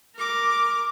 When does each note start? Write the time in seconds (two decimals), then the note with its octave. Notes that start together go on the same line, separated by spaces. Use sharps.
0.16 A#4 D6